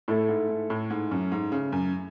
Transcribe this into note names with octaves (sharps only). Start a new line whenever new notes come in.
A2 A3 E4 A4
G#2
G#2
A2
G#2
F#2
G#2
C#3
F#2